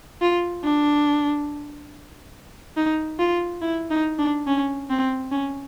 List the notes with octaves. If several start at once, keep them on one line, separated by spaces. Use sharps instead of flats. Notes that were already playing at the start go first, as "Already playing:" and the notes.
F4
D4
D#4
F4
E4
D#4
D4
C#4
C4
C#4